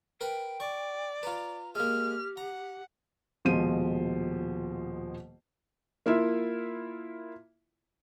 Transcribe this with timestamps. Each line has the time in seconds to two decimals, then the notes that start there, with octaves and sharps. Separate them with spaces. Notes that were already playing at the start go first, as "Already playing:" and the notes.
0.21 A#4 B4 G5 B5
0.60 D5 C#6
1.23 F4 B4 A#5
1.75 G#3 A#3 G4 F6
2.37 F#5 A#5
3.45 D#1 B2 F3 G#3 C5 D#7
6.06 A#3 E4 F4 E5